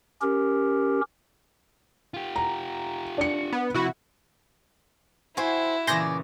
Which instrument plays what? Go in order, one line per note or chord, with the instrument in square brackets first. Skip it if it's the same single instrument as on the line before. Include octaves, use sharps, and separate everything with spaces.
[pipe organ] C#4 G4 A#4
[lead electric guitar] F4 G4
[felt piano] A#5
D4 C#7
[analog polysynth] B3
[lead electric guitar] C3 F3 [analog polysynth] E4 F#4
[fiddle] E4 [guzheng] F#4 E5 G5 [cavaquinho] C5 G#5 C6
[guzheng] A#2 C#3 E3 [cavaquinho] D5 G#5 [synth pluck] C6 G6 A#6